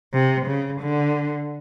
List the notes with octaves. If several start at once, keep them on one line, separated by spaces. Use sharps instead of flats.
C3
C#3
D3